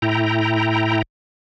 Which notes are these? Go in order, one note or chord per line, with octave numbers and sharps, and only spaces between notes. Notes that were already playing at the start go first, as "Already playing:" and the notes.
A2 E4 G5 A#5